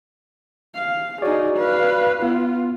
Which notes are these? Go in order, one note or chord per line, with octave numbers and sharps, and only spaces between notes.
F5
D#4 F#4 G#4 C#5 D5
B4 F5
B3 F4